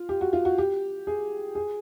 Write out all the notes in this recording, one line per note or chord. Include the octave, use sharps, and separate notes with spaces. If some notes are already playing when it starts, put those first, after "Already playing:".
Already playing: F4
G4
F#4
F4
F#4
G4
G#4
G#4